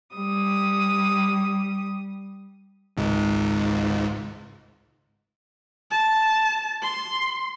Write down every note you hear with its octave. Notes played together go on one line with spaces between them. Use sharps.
G3 D#6
G#1 C#2 G#2
A5
C6